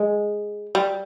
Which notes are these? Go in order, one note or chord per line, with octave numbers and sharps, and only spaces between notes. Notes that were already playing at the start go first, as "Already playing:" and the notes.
Already playing: G#3
G3